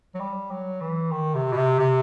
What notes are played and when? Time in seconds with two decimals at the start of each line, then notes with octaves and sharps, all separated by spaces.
0.14 F#3
0.20 G3
0.50 F#3
0.81 E3
1.12 D#3
1.34 C3
1.52 B2
1.57 C3
1.80 C3